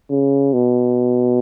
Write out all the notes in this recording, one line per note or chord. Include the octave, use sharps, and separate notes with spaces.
C#3
B2